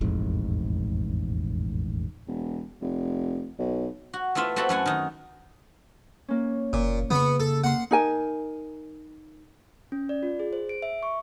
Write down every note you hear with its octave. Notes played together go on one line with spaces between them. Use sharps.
E1 A1 F2 G#2
E1
F1
B1
F#4
A3 B3 E4 F4 E5
A3 C4 F#4 A5 B5
F#2 A3 F#5 G#5
D#3 D#4
A#3 C#4
F#1 A#2
C#3 B3 B5 C#6
A4
A#3 F#5 C6
D#4 A#4 G#5
C#4
D5
F4
G#4
C5
D7
E5
C#6